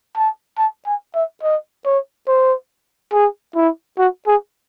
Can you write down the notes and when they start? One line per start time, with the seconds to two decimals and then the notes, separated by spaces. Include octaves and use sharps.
0.16 A5
0.58 A5
0.86 G#5
1.15 E5
1.43 D#5
1.85 C#5
2.28 C5
3.13 G#4
3.56 E4
3.98 F#4
4.27 G#4